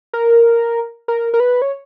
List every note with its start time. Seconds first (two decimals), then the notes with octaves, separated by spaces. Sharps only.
0.13 A#4
1.08 A#4
1.34 A#4
1.40 B4
1.62 C#5